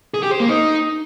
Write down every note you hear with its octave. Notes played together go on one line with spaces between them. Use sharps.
G#4
G4
C5
A#3
D#4